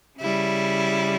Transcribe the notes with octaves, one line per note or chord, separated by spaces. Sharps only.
C#3 G3 E4